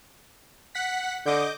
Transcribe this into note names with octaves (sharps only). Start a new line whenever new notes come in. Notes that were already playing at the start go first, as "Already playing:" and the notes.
F#5 B6
D3 D#5 D6 G6